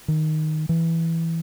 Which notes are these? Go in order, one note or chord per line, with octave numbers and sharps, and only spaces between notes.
D#3
E3